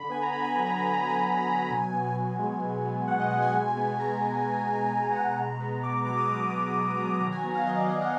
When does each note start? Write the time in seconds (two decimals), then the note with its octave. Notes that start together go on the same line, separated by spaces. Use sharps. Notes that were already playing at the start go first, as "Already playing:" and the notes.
Already playing: D3 B5
0.09 B3 G#5
0.22 A#5
0.33 D3 B5
0.44 G#5
0.55 F#3 G#5
0.67 A#5
0.78 D3 G#5
0.94 A#5
1.01 B3
1.09 G#5
1.24 D3
1.47 F#3
1.70 B2
1.93 B3
2.16 B2 G#5
2.39 G#3
2.62 B2
2.85 B3
3.08 B2 F#5
3.19 D#5
3.31 G#3 F#5
3.42 G#5
3.54 B2
3.77 B3
4.00 B2 A#5
4.22 G#3
4.46 B2
4.68 B3
4.92 B2
5.12 G#3 F#5
5.25 G#5
5.37 B2 A#5
5.60 B3
5.83 B2 D6
5.95 D6
6.06 F#3 D6
6.17 D#6
6.29 B2 D6
6.52 B3
6.75 B2
6.98 F#3
7.21 D#3 A#5
7.32 G#5
7.44 B3 G#5
7.55 F5
7.66 D#3 D#5
7.78 D5
7.90 F#3 D#5
8.01 F#5